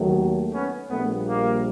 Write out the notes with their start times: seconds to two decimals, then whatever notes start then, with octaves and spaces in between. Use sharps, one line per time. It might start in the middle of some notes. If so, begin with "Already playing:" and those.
Already playing: D#2 D#3 F#3 A3
0.53 B3 C#4
0.90 A#1 A#2 G3 A3 B3
1.27 A#3